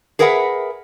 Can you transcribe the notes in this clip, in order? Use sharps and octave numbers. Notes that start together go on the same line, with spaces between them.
G#4 A#4 B4 E5 F#5